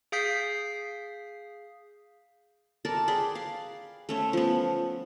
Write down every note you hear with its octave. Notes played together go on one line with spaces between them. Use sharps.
G#4 F5 D#6 G6 B6 C7
A4 A#4 D5 A5
G#4 B4 D5 G5
F5
A3 C#4 C5
F3 B3